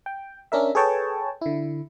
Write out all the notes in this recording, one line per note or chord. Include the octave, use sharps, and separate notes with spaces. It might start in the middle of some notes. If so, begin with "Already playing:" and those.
G5
C#4 D4 A#4 E5
G#4 A4 B4 C#5 G5 A5
D3 E4